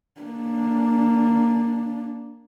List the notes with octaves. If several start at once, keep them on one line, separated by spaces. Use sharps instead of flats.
A#3 D4